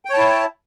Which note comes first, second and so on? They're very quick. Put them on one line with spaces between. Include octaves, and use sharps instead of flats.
G5 C#5 A5 E4